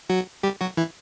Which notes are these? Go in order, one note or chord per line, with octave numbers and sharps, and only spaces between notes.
F#3 F#4
G3 G4
F#3 F#4
E3 E4